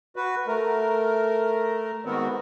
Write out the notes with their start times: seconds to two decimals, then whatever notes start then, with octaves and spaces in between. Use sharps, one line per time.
0.16 F#4 B4
0.47 A3 A#4
2.05 G#2 D#3 B3 C4 F#4